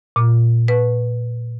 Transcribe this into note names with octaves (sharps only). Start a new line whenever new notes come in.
A#2
B4